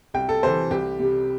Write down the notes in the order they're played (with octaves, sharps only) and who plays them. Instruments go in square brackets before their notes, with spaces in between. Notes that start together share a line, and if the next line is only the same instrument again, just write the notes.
[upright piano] C2 G5
A4
C3 E3 C5
C2 G4
C3 G3